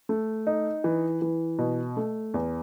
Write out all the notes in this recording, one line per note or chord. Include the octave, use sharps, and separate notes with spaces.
A3
D#4
E3
E3
B2
A3
E2